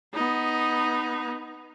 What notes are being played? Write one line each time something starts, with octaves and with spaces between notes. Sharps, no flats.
B3 D#4